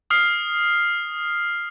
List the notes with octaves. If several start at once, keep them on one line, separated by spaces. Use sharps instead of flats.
D#6 F6 C7